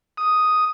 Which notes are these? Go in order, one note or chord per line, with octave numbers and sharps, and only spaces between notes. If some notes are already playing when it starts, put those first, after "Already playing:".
D#6